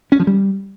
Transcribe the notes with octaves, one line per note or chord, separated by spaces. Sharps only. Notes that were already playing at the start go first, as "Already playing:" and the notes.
C#4
F3
G3